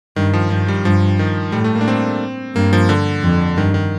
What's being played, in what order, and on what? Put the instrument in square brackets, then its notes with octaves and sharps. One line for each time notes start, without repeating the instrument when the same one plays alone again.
[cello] G2 [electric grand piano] D#3
[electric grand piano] F3
[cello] G2 [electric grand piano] F3
[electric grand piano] G3
[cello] G2 [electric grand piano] F3
[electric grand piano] D#3
[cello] A2 [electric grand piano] G3
[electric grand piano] A3
A#3
D4
C4
[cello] G2 [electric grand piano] A#3
[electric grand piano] F3
D3
[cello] F2
[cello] G2 [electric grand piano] D#3
[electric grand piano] D#3